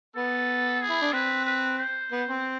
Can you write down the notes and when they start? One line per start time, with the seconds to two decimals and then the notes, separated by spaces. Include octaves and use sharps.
0.15 B3 A4
0.81 G#4
0.90 E4
1.02 D4
1.13 C4 B4
1.46 B4
1.78 C5
2.12 B3
2.28 C4